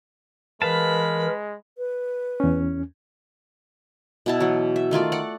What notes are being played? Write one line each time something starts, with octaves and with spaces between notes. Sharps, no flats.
E3 G#3 A#4 B4 F5 A5 B5
B4
E2 C#4
B2 E4 A5
E3 F#3
E5
D#3 A3 F4 D5
D5 F#5